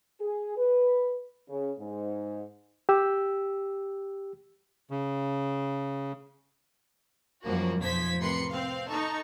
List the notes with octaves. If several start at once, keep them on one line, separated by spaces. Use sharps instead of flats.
G#4
B4
C#3
G#2
G4 E6
C#3
F#2 F3 G3 A#3 F#4
B1 F2 F3 C5 G#6 B6
A1 C3 A#4 B4 C6 C#7
C4 F5
D#4 A4 C#6